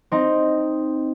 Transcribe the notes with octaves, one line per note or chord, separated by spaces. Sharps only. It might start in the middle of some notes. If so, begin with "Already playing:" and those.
C4 D#4